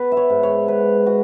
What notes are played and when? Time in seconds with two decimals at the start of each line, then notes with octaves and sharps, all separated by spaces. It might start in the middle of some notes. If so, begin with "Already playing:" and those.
Already playing: B3 B4
0.12 E5
0.17 C#5
0.30 G#2
0.43 C#5
0.68 G#2 B4
1.06 G#3 F#4